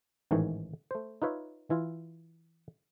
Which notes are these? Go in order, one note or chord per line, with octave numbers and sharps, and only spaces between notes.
A1 G#2 D#3 E3 C#5
A3 C5
D#4 F4 B4 C#5 E5
E3 E4 F4